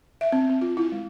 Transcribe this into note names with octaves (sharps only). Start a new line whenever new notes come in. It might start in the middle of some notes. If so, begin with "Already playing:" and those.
E5
C4
C4
F4
E4
G#3